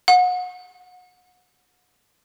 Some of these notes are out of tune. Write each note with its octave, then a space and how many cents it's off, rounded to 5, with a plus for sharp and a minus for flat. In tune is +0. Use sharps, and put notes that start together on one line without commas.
F#5 -30